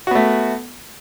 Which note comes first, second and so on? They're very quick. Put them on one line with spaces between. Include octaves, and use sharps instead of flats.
F#4 B3 A3